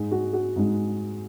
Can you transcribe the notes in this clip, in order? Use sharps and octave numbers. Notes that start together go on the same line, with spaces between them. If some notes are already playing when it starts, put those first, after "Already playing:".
Already playing: G#2 G#3
F#4
F#4
G#2 G#3